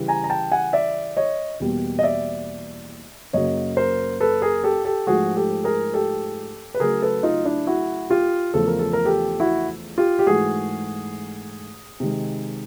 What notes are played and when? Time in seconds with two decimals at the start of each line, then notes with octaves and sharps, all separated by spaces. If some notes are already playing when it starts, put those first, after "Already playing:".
Already playing: C#3 E3 G3
0.08 G#5 A#5
0.24 A#5
0.30 G5 A5
0.51 F#5 G#5
0.73 D5 E5
1.17 C#5 D#5
1.60 E2 B2 G3 A#3
1.99 D#5
2.03 D5 E5
3.33 F#2 C#3 F#3 A#3 C#5 D#5
3.77 A#4 C5
4.20 A4 B4
4.42 G#4 A#4
4.64 G4 A4
4.85 G4 A4
5.07 G#2 F3 A3 F#4 G#4
5.36 G4 A4
5.64 G#4 A#4
5.94 G4 A4
6.74 B4
6.80 C#3 F#3 A3 G#4 A#4
7.02 A4 B4
7.23 D#4 F4
7.45 D4 E4
7.67 E4 F#4
8.10 F4 G4
8.54 E2 C#3 F3 A3 A4
8.67 A#4
8.79 A4
8.93 A#4
9.05 G4 A4
9.40 E4 F#4
9.98 F4 G4
10.19 G4
10.27 G#2 E3 A3 F#4 G#4
12.00 C3 D#3 G#3